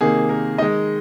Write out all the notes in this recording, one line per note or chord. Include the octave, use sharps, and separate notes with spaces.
C3 D#3 A#3 G#4
A#4
D#3 G#3 D#5